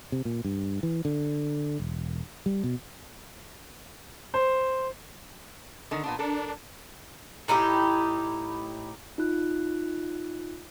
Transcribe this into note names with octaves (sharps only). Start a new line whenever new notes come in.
C3
A#2
G2
E3
D3
E1
G3
B2
C5
D3 D#3
A#2 B3 D4
D4 A4 A#4
A2 D#4 E4 G4
D#4 F4 F#6